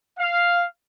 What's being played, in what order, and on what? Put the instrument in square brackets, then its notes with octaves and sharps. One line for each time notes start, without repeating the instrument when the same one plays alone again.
[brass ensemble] F5